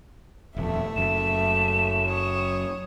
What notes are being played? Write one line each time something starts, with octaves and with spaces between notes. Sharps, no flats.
D#1 F2 A3 E5
F#1 F#2 E7
C#5 D#6